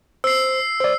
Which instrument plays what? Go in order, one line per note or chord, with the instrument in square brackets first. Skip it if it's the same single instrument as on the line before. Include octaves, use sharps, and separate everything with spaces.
[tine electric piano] C5 [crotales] E6 C7
[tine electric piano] C5 D5